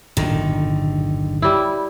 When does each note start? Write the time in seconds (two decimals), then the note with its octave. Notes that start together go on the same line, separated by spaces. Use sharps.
0.17 D1 G1 A#2 D3 D#3
1.42 G3 E4